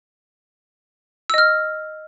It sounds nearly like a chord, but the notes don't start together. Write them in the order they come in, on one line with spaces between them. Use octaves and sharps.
E6 D#5 F6